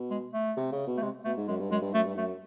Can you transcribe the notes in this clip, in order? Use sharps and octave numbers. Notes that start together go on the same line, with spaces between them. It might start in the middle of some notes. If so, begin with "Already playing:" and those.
Already playing: B2
G#3
A3
C3
C#3
B2
A3
C3 G#3
B2 A3
G#2
F#2 G#3
G2
F#2 G#3
G2
F#2 A3
G2
F#2 A3